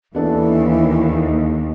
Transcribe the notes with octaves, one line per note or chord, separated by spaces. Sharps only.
D#2 E3 B3 D4 A4